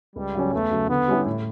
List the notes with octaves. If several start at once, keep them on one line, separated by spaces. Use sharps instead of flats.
C#2 G3
C#3 F#3 C#4
E2 A3
C#3 F#3
D3 B3
G3 C#4 E4 G4
A2